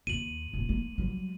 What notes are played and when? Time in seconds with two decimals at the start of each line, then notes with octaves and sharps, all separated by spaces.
0.07 D#2 D#7 F#7
0.53 D#1
0.69 A#3
0.98 F#3 G3